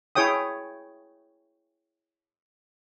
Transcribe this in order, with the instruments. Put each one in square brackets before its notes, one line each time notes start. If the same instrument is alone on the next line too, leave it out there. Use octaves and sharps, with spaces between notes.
[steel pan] E4 G#4 C#5 G5 D#6